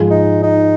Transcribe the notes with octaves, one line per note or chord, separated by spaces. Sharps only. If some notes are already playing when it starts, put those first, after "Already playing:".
Already playing: G#2 F3 G#3
D#4
D#4